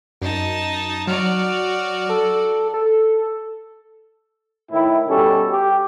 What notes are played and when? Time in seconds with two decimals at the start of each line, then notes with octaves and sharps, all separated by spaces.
0.22 F#2 D#4 A5
1.07 F#3 F#4 D5 F6
2.09 A4
2.74 A4
4.71 A2 D#3 E4
5.08 B2 G3 C#4 A4
5.51 G4